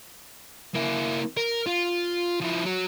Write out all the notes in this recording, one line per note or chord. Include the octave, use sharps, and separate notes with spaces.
A#3 E4
A#4
F4
F3 E4
F#3 F#4